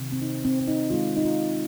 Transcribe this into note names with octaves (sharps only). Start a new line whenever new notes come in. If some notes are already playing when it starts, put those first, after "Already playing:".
Already playing: C3 D#3 A#3
C4
D#4
C4
C4
D#4
D#3 G#3 C4 F4
D#4
F4